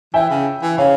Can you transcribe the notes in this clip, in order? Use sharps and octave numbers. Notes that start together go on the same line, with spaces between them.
E3 E5 G5
C#3
E3
C#3 C#5 F5